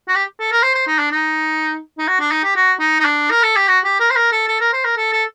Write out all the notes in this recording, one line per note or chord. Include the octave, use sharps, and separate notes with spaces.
F#4
G4
A4
A#4
C5
C5
D#4
D4
D#4
D#4
F#4
D4
D#4
G4
F#4
D#4
D#4
D4
A#4
A4
G4
F#4
G4
A#4
C5
A#4
A4
A4
A#4
C5
A#4
A4
A4